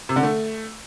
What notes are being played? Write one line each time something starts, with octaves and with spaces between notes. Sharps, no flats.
C3
D3
A3